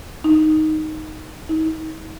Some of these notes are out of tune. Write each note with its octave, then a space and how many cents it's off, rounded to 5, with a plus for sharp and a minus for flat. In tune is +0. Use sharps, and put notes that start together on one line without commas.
D#4 +0
D#4 +40